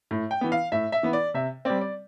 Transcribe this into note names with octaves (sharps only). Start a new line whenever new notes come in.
A2
G5
E3 B3
F5
A2 E5
E5
E3 B3
D5
C3 E5
G3 C4 D5
D5